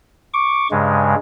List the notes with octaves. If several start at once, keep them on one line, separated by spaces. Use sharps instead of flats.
C#6 D6
G2 C#3 G#3